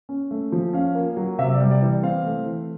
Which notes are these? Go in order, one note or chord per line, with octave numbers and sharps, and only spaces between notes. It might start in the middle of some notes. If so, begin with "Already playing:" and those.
C#4
A3
F3
C#4 F5
A#3
F#3
C3 E5
D5
G3
D5
E3
C4 F5
A3
E3